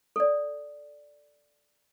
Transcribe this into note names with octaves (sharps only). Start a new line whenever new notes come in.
A4 D5